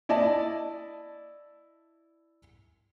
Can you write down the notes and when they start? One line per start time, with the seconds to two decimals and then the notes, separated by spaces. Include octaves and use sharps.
0.09 E4 D5 D#5 A5